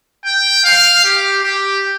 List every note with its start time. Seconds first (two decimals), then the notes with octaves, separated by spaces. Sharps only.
0.25 G5
0.64 F5
1.04 G4
1.43 G4